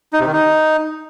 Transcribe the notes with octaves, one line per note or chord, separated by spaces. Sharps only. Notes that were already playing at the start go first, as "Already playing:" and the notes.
D#4
C3
D#3
D#4